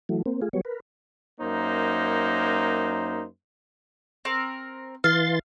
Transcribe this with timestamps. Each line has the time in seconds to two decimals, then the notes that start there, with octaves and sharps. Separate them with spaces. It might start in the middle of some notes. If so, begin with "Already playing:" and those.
0.09 E3 F#3 A3
0.26 A#3 C4
0.41 A3 F4 G#4
0.53 F#3 G3 B3 C#5
0.65 A#4 B4
1.40 F#2 A#3 D#4 C5
4.25 C4 A#4
5.04 E3 F5 C6 A6